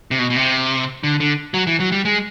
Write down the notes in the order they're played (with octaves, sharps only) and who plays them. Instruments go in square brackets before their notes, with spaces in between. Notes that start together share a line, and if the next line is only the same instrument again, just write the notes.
[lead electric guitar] C3
B2
B2
C3
D3
D3
F#3
E3
F#3
G3
G#3